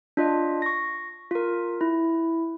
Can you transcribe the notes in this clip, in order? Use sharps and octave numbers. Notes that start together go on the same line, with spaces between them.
D4 F4 D#5
C#6 A#6
F4 A#4
E4